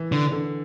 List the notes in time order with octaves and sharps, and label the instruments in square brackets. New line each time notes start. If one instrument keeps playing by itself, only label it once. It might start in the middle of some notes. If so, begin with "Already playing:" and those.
Already playing: [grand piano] E3
[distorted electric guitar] D3
[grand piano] D3